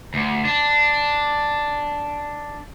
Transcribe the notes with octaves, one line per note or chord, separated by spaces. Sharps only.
D2
D4